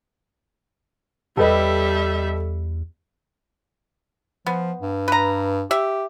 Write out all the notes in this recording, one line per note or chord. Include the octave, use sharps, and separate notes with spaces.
E2 G3 G4 A4 B4 D#5 E5
F3 B3
G2
B4 A#5
G4 E5